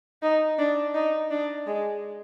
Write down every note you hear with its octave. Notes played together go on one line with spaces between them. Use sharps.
D#4
D4
D#4
D4
G#3